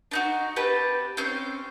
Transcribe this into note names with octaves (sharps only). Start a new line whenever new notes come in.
D4 D#4 F#4
C4 G4 B4 A5
C4 C#4 C6 G6